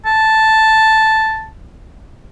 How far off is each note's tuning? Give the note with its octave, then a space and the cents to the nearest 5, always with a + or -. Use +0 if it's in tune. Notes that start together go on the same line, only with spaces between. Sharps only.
A5 +0